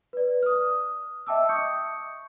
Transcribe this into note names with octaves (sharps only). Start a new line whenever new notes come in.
B4 D5
D#6 F6
D#5 E5 G5 A5 D6 E6
C#6 D#6 G6 C#7